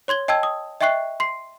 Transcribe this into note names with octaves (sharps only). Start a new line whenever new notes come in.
C#5 C6 G#6 G7
D#5 G5 A5 E6 G#6
D#6
D#5 E5 G5 C#6 F#6 C7
C6 C7